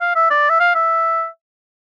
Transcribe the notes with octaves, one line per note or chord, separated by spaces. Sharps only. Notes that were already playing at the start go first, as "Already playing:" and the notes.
F5
E5
D5
E5
F5
E5